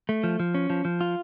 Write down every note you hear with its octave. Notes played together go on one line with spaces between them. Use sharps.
A3
F3
F3
C#4
F3
F3
F4